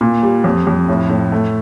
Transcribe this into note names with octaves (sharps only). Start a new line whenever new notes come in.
A#2
G3
F2
F2
A2
A2
A3